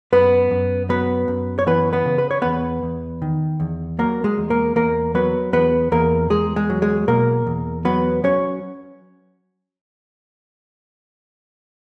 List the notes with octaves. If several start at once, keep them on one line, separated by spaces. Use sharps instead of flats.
F#2 B3 B4
F#2
F#3 B3 B4
F#2
C#5
E3 B3 B4
B3 B4
C#3
B4
C#5
E2 B3 B4
E2
D#3
E2
F#3 A#3 A#4
G#3 G#4
E2
A#3 A#4
E2 A#3 A#4
F#3 B3 B4
E2 B3 B4
E2 A#3 A#4
E2 G#3 G#4
G#3 G#4
F#3
G#3 G#4
B2 A#3 A#4
E2
F#3 B3 B4
F#3 C#4 C#5